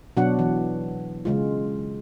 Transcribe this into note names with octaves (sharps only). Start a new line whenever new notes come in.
B2 F#3 D4 F#4 F#5
E3
C#3 G#3 F4